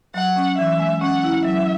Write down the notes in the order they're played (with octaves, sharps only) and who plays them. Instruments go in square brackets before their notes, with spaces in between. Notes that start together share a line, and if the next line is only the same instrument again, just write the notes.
[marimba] F#3 [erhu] F#5
[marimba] C#4
[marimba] E3 [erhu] E5
[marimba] G#3
[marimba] C#4 [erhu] F#5
[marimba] E4
[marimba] F#3 [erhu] E5